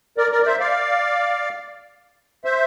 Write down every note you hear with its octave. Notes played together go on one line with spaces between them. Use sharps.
A#4 D5
A#4 D5
D5
C5 E5
D5 F5
C5 E5